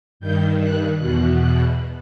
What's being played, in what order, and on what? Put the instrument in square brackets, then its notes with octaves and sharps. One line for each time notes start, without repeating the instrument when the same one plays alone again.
[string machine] G2 D#3 G6
F#6
E2 B2 F#6
F#6